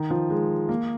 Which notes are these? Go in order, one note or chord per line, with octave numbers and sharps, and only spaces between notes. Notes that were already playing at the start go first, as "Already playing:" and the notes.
Already playing: D#3
F3
G#3
A#3